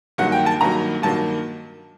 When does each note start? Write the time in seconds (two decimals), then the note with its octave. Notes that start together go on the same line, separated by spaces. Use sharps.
0.18 G2 D#3 F#3 A#3 F#5
0.32 G5
0.46 A5
0.61 G2 D#3 F#3 A#3 A#5
1.02 G2 D#3 F#3 A#3 A5